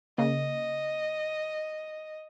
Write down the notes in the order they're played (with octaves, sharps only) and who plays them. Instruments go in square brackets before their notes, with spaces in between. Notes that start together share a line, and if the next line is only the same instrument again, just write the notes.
[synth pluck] C#3 A#3 [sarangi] D#5